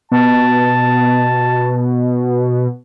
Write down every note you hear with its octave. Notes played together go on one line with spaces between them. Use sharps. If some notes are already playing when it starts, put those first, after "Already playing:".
B2 A5